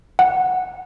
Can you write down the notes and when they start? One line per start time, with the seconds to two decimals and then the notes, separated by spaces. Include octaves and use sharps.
0.19 F#5